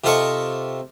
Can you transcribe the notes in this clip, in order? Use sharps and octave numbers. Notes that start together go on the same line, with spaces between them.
C3 F4 A4 D#5 C#6